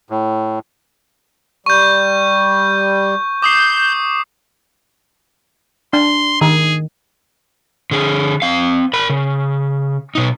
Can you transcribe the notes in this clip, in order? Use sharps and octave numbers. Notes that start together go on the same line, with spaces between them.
A2
G3 C#6 G6
D6 D#6 G6 C7
D4 C6
D#3 G#4
D3 G#4
C4 F5
A#4 B5
C#3
B2 D#4